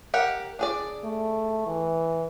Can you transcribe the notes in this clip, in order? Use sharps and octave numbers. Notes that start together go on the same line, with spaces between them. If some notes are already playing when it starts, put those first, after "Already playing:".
G4 A#4 F#5
D4 G#4 D5
A3
E3